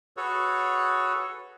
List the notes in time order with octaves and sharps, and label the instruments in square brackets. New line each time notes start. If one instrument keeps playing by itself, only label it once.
[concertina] F#4 G#4 A4 B4 C#5